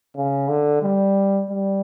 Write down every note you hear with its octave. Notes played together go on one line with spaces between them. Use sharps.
C#3
D3
G3
G3